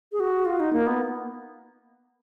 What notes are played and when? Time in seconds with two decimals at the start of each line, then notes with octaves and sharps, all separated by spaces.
0.12 G#4
0.20 F#4
0.46 F4
0.60 D#4
0.73 A#3
0.87 B3